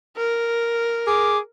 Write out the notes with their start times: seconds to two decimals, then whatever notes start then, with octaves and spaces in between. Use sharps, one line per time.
0.17 A#4
1.07 G#4 D6